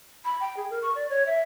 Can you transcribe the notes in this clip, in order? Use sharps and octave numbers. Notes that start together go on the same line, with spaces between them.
B5
G5
G#4
A#4
C#6
D5
C#5
E5